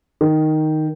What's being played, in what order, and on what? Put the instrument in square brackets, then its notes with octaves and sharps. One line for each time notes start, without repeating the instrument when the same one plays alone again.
[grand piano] D#3